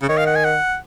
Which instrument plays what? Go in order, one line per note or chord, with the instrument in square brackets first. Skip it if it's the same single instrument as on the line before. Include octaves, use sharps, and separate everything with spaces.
[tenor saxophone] C#3
[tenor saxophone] D#3 [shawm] C#5
[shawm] F5
F#5
G#5
F#5